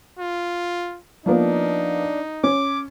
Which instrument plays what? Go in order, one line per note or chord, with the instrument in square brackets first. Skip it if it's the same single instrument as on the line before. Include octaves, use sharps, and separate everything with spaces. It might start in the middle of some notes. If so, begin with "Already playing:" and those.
[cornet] F4
[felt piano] F3 A#3 B3 [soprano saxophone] D4 [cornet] D#4
[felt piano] C#4 [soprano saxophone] D6